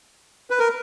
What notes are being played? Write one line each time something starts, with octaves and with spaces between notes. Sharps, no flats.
B4
A#4